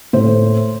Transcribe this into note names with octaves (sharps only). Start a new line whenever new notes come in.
A2 C5